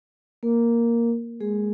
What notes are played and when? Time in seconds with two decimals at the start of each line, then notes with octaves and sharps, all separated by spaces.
0.43 A#3 A#4
1.40 G#3 G#4